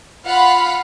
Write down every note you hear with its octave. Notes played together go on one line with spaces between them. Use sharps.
F4 F5 F#5 B5